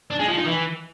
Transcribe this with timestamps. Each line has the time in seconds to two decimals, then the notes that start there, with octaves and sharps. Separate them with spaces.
0.11 D4
0.19 G#3
0.28 F3
0.37 D#4
0.46 E3